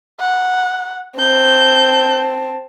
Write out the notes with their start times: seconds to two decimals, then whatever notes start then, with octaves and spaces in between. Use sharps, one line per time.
0.20 F#5
1.19 C4 A5 G6